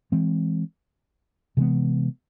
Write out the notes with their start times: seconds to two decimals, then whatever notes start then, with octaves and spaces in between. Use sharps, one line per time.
0.12 E3 G#3 C4
1.57 C3 E3 G#3 B3